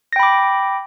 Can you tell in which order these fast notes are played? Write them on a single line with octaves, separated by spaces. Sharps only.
A#6 G5 B5 D6